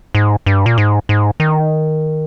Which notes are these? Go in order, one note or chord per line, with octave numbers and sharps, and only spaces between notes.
G#2
G2
A#2
G#2
G#2
D#3